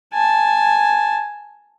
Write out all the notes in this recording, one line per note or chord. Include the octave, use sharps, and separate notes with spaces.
G#5 A5